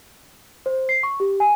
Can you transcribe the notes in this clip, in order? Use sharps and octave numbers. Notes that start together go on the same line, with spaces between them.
C5
C7
C#6
G4
G#5